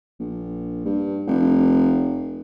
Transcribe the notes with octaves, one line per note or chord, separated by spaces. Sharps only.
A#1
G2
F1